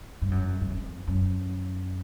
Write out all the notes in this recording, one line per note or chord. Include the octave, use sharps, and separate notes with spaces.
G2
F#2
F#2
F2
F#2